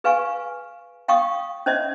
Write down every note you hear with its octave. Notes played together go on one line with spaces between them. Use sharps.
G#4 B4 F5 G#5 C#6
F5 G5 C#6 D#6
C#4 C5 D#5 E5